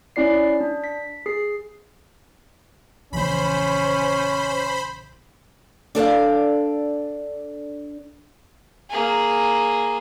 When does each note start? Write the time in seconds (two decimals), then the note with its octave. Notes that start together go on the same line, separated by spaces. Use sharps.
0.16 C#4 E4 D5 C7
0.61 D4
0.84 B6
1.26 G#4 C7
3.13 A#1 C#3 E3 C#4 C5 B5
5.95 D4 A4 D5 F5
8.90 A#3 G#4